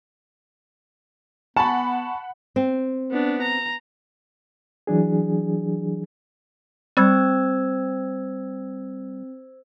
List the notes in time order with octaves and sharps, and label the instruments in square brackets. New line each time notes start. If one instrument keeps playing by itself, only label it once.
[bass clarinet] B3 [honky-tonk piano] F#5 B5 [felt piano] G#5 C#6 [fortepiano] A5
[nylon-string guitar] C4
[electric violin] B3 D4
A#5
[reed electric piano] E3 F#3 D4 G#4
[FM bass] G3 [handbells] C4 [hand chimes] C5 E6 G#6